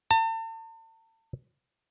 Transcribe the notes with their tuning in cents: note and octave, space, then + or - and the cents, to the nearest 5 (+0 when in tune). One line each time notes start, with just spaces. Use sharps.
A5 +40